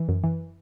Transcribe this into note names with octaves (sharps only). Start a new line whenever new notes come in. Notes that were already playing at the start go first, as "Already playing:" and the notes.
Already playing: E3
F#2
E3